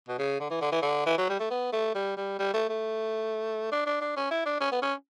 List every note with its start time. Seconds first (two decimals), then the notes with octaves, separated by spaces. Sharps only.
0.08 B2
0.19 C#3
0.40 D3
0.50 E3
0.61 D3
0.72 E3
0.82 D3
1.06 E3
1.18 F#3
1.29 G3
1.39 A3
1.50 B3
1.72 A3
1.95 G3
2.17 G3
2.39 G3
2.53 A3
2.69 A3
3.72 D4
3.86 D4
4.01 D4
4.16 C#4
4.31 E4
4.46 D4
4.60 C#4
4.71 B3
4.82 C#4